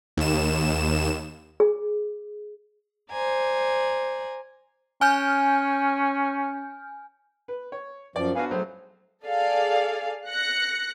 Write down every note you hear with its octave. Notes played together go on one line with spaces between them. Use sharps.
D#2 E7
G#4
C5 D5 G#5 A#5
C#4 G#5 F6 G6
B4
C#5
F#2 F3 D5
B3 D4 F#4 F5 G#5
A#1 F#3 A3 C5
G#4 A4 D5 F5
F#6 A#6 C#7